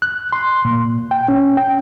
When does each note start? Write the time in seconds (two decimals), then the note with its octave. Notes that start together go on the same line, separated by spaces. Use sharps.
0.02 F#6
0.32 C6
0.65 A#2
1.11 G5
1.28 C#4
1.57 G5